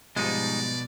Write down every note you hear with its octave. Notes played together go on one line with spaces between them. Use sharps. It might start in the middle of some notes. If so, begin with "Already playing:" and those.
G#2 B2 F3 G3 G#3 D#4 D5